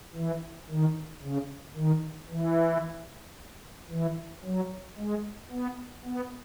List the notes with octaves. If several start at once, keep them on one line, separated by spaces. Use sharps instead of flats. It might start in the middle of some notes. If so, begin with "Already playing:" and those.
E3
D#3
C#3
D#3
E3
E3
F#3
G#3
B3
B3